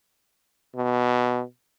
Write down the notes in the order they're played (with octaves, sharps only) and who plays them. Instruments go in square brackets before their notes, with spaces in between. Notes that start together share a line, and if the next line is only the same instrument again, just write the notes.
[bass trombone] B2